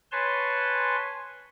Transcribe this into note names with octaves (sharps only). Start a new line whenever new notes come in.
B4 C#5 G#5 A5 C6